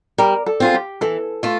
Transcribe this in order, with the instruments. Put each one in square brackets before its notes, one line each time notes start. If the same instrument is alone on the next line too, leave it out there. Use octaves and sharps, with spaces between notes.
[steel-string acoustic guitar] G3 [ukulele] A#4
[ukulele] A4
[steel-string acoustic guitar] C4 F4 [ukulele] G#4
[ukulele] G4
[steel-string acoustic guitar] E3 [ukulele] A4
[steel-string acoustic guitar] A3 F4